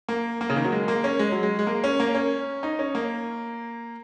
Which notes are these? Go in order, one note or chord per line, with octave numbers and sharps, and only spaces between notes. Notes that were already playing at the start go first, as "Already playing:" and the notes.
A#3
A#3
C#3
D#3
F#3
G#3
A#3
C#4
G#3
F#3
G#3
G#3
A#3
C#4
A#3
C#4
D#4
C#4
A#3